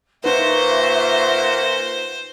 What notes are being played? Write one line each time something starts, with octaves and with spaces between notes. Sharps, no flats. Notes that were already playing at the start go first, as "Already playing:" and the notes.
A#2 D#4 B4 C5 E5 F#5 C#6